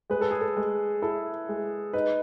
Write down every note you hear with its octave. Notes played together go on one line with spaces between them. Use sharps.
G#3 B4
A4
G#4
A4
G#3
E4 A4
G#3
D#4 B4